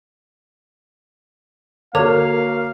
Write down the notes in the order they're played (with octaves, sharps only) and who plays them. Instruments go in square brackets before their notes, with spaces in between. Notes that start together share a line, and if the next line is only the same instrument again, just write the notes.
[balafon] D3 A4 D6 [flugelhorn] A#3 [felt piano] F#4 C#5 [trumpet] F5